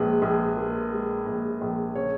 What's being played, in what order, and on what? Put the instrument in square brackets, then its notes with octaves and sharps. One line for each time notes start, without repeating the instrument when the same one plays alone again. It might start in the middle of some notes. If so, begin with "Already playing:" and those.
Already playing: [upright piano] A#1 G#3 G#4 B4
A#1 G#4
A#2 A#4
G#3
A#1
A#1
C#3 C#5